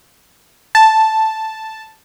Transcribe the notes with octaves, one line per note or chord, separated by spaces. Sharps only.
A5